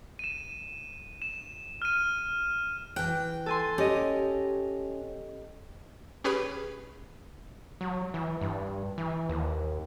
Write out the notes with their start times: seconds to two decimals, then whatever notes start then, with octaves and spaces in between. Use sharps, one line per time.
0.19 D#7 E7
1.22 E7
1.82 F6 D#7
2.96 E3 G5 F#6
3.46 A4 G#5 C6
3.78 C#4 G4 D#5
6.24 C#4 G4 G#4 B4 C#5 B5
7.81 F#3
8.14 E3
8.41 G2
8.98 E3
9.29 D#2